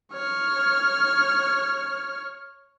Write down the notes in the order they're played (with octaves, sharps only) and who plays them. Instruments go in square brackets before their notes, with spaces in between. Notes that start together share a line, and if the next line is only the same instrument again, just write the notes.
[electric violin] C#5 F6